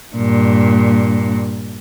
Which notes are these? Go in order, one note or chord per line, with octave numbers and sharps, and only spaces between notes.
G2 A#2